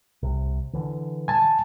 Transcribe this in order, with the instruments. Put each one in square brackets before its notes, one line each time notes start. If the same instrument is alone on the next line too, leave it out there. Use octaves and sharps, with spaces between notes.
[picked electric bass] C2 C3
D3 E3
[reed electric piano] G#5 A5